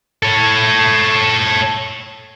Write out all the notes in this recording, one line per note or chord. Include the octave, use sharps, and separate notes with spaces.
A4 C#5